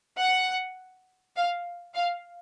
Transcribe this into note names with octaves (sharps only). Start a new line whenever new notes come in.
F#5
F5
F5